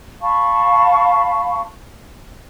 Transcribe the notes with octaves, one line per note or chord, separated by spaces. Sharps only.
F5 A5 B5 C#6